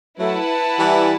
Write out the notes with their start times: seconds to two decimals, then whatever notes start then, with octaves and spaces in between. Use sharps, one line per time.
0.19 F#3 A3 E4 B4 F#5 A5
0.79 E3 G3